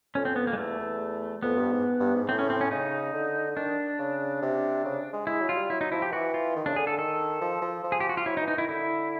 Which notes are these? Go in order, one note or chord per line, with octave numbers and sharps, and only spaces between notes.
F2 C#4
C4
B3
A#3
G#3
E2 A3
E2
F2 B3
G2
G#2
G2
G#2
A2 C4
C#4
C4
C#4
C#3 D#4
D3
D#3 D4
C#3
C3
C#3
G#3
G#3 E4
F#3
F4
G3
F#3 E4
D#4
F3 E4
G4
E3 F#4
F4
D#3
C#3 D4
D3 G#4
D3 A4
D#3 A4
F3
F3
F3
G#4
G4
F#4
F4
F#3 E4
D#4
E3
D#4
D#3 E4
D3 E4